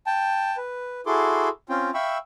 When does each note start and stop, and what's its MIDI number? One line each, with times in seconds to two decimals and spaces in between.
0.07 0.57 79
0.07 0.57 81
0.57 1.01 71
1.06 1.49 64
1.06 1.49 66
1.06 1.49 68
1.06 1.49 69
1.06 1.49 84
1.06 1.49 86
1.69 1.91 60
1.69 1.91 61
1.69 1.91 65
1.69 1.91 79
1.94 2.18 76
1.94 2.18 77
1.94 2.18 79
1.94 2.18 83
1.94 2.18 85
1.94 2.18 88